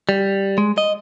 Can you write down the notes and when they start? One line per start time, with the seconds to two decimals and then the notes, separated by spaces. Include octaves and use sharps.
0.09 G3
0.58 G#3
0.78 D#5